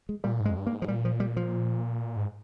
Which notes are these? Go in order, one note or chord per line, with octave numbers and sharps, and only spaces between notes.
G#3
A#2 G3
G#2
G#3
F2
G2
A#3
G#2
F3
A#2 G3
F3
G3
F3
G#2